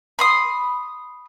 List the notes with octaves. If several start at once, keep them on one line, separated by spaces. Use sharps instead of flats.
B5 C6 D#6